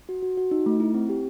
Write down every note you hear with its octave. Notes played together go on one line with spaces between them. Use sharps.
F#4
F#4
F#4
D#4
A3
E4
C4
G4